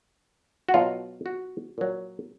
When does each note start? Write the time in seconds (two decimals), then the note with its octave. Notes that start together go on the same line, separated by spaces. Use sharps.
0.69 F#4
0.74 B2 F#3 F4
1.26 F#4
1.78 A#2 F#3